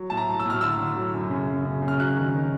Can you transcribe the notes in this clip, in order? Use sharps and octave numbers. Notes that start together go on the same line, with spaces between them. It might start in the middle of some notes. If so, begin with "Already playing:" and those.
Already playing: F#3
A2 A5
A#5
F#3
E6
A2 F6
D3 E6
D3
F#3
F#2
C#3
F#2
C#3
C#3
F6
F#3 F#6
D#3
D#3